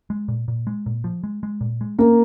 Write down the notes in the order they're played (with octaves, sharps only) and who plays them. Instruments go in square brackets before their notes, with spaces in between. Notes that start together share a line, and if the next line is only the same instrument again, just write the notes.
[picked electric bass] G#3
A#2
A#2
G#3
A#2
F3
G#3
G#3
A#2
G#3
[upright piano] A#3 A#4 [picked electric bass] C#4